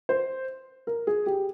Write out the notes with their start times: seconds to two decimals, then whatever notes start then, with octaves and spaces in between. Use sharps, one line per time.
0.09 C5
0.87 A#4
1.07 G#4
1.26 G4